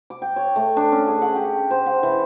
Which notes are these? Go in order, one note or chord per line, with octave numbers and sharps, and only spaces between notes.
D6
G5
C#5
A3
D4
C#4
G#4
F#5
G4
C5
F#5
E3